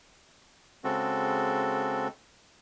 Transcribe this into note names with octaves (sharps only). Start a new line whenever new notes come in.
C#3 G#3 C4 F#4 A4